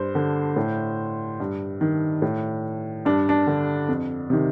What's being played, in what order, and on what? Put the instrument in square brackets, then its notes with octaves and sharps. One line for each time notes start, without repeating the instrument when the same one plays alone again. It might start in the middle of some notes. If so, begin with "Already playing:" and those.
Already playing: [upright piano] G2 C5
D3
A2
G2
D#3
A2
G2 D4
D4
D3
F2
C3 D#3